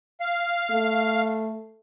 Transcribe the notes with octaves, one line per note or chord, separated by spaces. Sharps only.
F5
A3